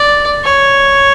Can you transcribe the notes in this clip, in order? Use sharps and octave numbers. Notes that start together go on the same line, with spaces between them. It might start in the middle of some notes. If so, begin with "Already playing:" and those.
Already playing: D5
C#5